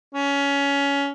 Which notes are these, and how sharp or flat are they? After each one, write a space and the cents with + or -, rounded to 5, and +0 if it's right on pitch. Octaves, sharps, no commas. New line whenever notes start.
C#4 +20